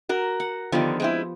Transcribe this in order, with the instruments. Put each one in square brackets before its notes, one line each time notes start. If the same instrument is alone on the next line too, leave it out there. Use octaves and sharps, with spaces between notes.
[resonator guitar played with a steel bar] F#4 A#4
[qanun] F#5
[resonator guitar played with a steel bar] D3 D#3 [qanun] F3 B3 G4
[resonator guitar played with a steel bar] G#3 C4 E4